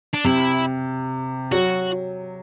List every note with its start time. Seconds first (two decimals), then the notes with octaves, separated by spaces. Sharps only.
0.14 D4
0.24 C3 E4
1.52 F#3 F#4